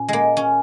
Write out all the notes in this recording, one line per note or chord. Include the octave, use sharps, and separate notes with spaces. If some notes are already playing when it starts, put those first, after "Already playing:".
Already playing: A#2 C#4
G#3 A#3
C#4